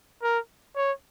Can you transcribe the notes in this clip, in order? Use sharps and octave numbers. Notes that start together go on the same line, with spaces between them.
A#4
C#5